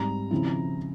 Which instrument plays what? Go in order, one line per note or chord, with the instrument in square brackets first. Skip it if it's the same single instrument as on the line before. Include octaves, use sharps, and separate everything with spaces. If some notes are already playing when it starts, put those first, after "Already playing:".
Already playing: [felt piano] G#2 G3 C4 G4 [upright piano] A#5
[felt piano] C#3 F3 C4 E4